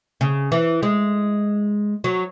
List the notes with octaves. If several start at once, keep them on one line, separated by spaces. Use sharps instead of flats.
C#3
E3
G#3
F#3